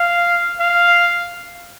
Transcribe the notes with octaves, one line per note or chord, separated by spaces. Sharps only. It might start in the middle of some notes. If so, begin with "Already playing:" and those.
Already playing: F5
F5